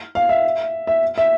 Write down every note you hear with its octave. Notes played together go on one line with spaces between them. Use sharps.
F5
E5
E5
E5